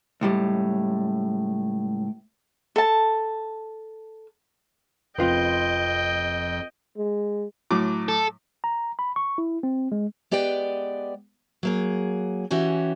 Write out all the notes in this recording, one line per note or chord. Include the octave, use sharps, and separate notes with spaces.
C#2 A2 G3
A4 A5
F1 F2 F3 C4 F4 B4 D#5 G5
G#3
A2 F#3 D6
A4
A#5
B5
C#6
E4
C4
G#3
G#3 B3 G4 D5 G5
F#3 A#3 G#4
E3 C#4 F#4 G4